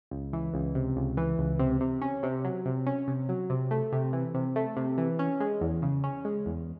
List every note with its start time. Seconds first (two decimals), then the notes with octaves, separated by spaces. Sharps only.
0.11 C#2
0.33 E3
0.54 C#2
0.75 C3
0.96 C#2
1.17 E3
1.38 C#2
1.59 C3
1.81 C3
2.02 C#4
2.23 C3
2.44 F#3
2.66 C3
2.87 C#4
3.08 C3
3.29 F#3
3.50 C3
3.71 A3
3.92 C3
4.13 E3
4.34 C3
4.56 A3
4.77 C3
4.98 E3
5.19 C#4
5.40 G#3
5.61 E2
5.82 C#3
6.04 C#4
6.25 G#3
6.46 E2